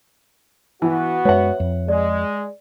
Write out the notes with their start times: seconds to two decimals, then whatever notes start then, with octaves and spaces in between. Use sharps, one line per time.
0.82 E3 B3 F#4
1.25 F#2 G#3 B4 C#5 E5 F#5
1.60 F2
1.88 G#3 D5